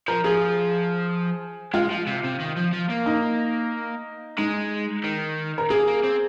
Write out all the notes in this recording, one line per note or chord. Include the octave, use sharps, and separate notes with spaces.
F3 A#4
F3 G#4
G#3 F4
F3
C3
C3
D#3
F3
F3
A#3
D#4
G#3 D#4
D#3
A#4
A#3 G#4
A#3
C4